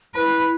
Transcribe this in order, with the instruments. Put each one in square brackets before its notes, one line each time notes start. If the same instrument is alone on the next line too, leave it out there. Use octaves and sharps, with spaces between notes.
[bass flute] E4 [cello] B4